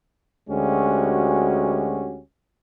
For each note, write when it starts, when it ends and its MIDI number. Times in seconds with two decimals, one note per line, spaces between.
0.49 2.21 38
0.49 2.21 56
0.49 2.21 61
0.49 2.21 66
0.49 2.21 67